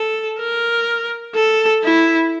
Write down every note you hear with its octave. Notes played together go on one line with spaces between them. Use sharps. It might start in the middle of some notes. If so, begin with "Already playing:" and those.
Already playing: A4
A#4
A4
E4